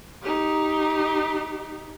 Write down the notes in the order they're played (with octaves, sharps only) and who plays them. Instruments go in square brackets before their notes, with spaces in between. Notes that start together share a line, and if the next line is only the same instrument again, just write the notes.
[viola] D#4 G4